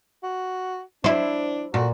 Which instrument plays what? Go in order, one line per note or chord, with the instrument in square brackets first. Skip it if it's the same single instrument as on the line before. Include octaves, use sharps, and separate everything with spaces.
[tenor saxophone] F#4
[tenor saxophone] D4 [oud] E4 C5
[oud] A#2 [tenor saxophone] F#4